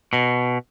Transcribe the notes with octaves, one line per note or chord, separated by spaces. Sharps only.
B2